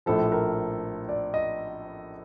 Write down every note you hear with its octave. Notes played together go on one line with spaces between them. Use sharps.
A#1 A2 F3 A4
A#4
D5
D#5